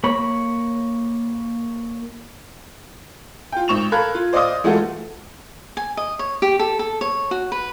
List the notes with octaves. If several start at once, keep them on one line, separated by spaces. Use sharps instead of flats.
A#3 C#5 B5
F4 G5
G#1 C#6 E7 F7
A4 A#4 F5 B5 F#6 G#6
F4
C5 D5 D#5 F5 D6 D#6
E3 G#3 A3 F4 F#4 A4
G#5
D#5
C#5
G4
A4
A4
C#5
F#4
B4